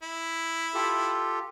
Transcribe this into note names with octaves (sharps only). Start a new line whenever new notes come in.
E4
F4 G4 A4